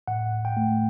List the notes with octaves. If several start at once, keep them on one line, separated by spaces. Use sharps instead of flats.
A2 F#5
A2
G5
A3